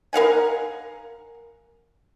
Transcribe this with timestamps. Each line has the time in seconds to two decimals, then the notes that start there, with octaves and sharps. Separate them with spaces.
0.13 A#4 F5 F#5 G#5